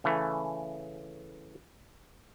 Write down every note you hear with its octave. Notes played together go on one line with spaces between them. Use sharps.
C#3 E3 A3